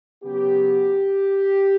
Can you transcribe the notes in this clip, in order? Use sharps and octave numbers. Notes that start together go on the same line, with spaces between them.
C#3 F#3 B3 G4